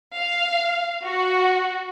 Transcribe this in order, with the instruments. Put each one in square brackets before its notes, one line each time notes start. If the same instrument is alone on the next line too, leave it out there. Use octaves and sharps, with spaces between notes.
[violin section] F5
F#4